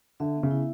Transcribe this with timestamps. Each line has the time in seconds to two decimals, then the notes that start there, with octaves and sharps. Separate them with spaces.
0.20 D3 E5
0.36 B3
0.43 C#3
0.51 E4